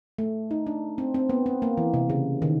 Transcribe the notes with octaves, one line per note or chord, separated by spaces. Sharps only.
A3
D#4
D4
C4
C4
B3
C4
A#3
E3
C3
C#3
D#3